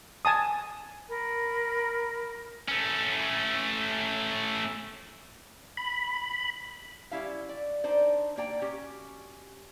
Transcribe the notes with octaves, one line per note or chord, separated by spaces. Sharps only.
G#5 A5 D#6
A#4 B5
A3 C#4
B5
G3 C#4 E4 E5 F5
D5
D4 D#4 C5 D5
A#3 D5 G5 A#5
C#4 F#4 G4